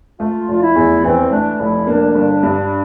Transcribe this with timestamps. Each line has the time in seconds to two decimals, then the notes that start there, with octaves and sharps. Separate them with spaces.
0.19 A3 F4
0.48 F1 F4
0.62 E4
0.75 E2
1.04 E3 C4
1.31 A3 D4
1.59 F1 E4
1.87 A#3 D4
2.14 G1
2.43 G2